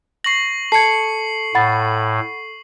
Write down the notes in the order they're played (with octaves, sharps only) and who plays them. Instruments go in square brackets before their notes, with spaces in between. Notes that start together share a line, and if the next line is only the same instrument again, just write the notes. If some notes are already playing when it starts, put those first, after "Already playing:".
[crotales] C#6 F#7 [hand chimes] A#6 C7
[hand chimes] A4 C#7 [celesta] A5 G#6 [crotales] C7
[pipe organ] A2 [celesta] F#5 B5 A6